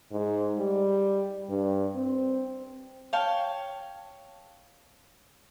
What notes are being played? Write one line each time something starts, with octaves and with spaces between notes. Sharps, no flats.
G#2
G3
G2
C4
C#5 F5 G5 A5